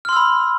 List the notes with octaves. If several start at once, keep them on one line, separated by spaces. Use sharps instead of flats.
B5 C6 E6 F6